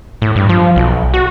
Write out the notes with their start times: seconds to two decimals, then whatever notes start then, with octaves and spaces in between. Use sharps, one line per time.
0.22 A2
0.36 G2
0.49 F3
0.76 B1
1.14 F#4